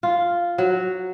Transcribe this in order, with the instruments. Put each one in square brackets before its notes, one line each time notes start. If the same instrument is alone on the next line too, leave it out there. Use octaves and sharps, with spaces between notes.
[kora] F4
F#3